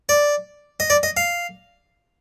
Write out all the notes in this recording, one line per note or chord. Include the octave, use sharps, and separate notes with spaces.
D5
D#5
D5
D#5
F5